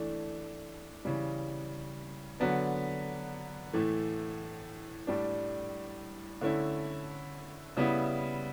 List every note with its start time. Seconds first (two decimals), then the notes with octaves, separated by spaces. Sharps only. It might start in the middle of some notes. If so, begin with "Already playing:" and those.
Already playing: E3 A3 D4
1.05 C#3 E3 G3
2.40 D3 F#3 B3 D4
3.73 A2 E3 A3
5.07 A2 G3 D4
6.41 D3 A3 C#4 E4
7.77 C#3 G3 B3 E4